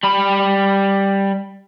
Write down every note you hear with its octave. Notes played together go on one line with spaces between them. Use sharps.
G3 B5